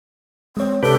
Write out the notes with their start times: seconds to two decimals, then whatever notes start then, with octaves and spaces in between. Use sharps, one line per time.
0.57 G#3 C4 C#5
0.83 C3 D4 G4 A4 B4